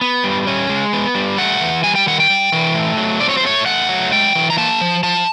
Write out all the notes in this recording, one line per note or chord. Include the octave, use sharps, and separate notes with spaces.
B3
G3
C#4
G#3
B3
G3
A3 F#5
E3
G3 G#5
G5
D#3 F#5
G5
G3
E3
A3
F#3
C4 D5
C#5
C5
A3 C#5
A3 F#5
F#3
G#3 G5
E3
A#5
A#3 A5
F3
F3 A5